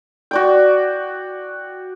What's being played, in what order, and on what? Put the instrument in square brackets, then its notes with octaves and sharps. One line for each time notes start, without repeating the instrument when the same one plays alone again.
[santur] F#4 D5 G5